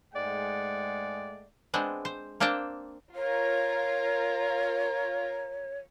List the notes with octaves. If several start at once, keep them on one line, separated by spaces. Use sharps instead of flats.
G#2 G#3 A3 D5 F#5 G5
G#3 B3 C4 D4
C5
A#3 C4 D4 C5 G5 A5
F4 A#4 C#5